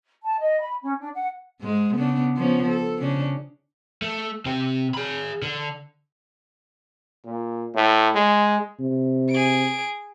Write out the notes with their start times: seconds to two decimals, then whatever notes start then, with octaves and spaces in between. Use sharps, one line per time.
0.23 A5
0.40 D#5
0.61 B5
0.82 C#4
1.00 D4
1.14 F#5
1.61 G#2 G#3
1.95 C#3 B3 D4
2.36 F3 B3 C#4
2.68 A4
3.00 C#3 C#4 D4
4.02 A3
4.46 C3 G4
4.94 G#4 B5
5.42 D3
7.26 A#2
7.75 A2
8.15 G#3
8.80 C3
9.31 G#4 D7